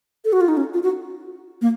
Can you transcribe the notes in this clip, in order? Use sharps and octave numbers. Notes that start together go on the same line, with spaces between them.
A4
F#4
F4
D#4
C#4
F4
F#4
A#3